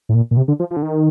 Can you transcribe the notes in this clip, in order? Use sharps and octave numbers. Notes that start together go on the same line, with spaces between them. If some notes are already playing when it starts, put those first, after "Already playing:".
A2
A#2
A#2
C3
D3
F3
F3
D3
D#3